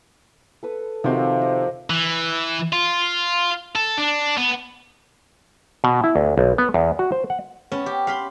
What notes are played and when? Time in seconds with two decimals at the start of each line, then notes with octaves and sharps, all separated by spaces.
0.63 A4 B4 D#6
1.04 C3 D#3 F3 C4 F#4
1.41 D#5 G5
1.90 E3
2.72 F4
3.76 A4
3.98 D4
4.37 B3
5.84 B2
6.04 E4
6.16 D2
6.38 B1
6.58 B3
6.74 E2
6.99 F#4
7.12 C5
7.30 F#5
7.72 B3 C#4 A5
7.86 G4
8.07 F5 B5 C6